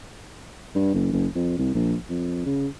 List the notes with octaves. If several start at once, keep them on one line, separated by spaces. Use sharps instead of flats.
G2
F#1
F#1
F2
C2
A#1
F2
C#3